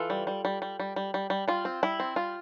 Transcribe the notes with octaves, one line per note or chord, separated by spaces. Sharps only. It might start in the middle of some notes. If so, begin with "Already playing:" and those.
Already playing: E3 F4 A4
G3
G3
G3
G3
G3
G3
G3
G3
G3 F4
C4
G3 E4
C4
G3 F4